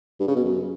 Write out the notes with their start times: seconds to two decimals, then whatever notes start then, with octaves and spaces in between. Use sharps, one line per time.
0.20 G2
0.28 C#3
0.36 B2
0.44 F#2